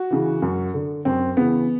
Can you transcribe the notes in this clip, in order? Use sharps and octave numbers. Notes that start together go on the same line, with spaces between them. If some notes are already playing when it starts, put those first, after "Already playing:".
Already playing: F#4
C#3 E3
F#2
D3
F#2 C4
C#3 E3 B3